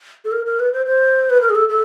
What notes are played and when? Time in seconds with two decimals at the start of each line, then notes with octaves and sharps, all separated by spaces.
0.25 A4
0.32 A#4
0.46 A#4
0.59 B4
0.73 C5
0.86 C5
1.30 B4
1.41 A#4
1.49 G#4
1.55 A4
1.69 A4